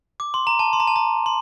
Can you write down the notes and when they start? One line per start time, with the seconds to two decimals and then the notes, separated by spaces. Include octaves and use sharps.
0.20 D6
0.34 C6
0.47 A#5
0.59 A5
0.73 C6
0.80 A#5
0.88 A5
0.96 A#5
1.26 C6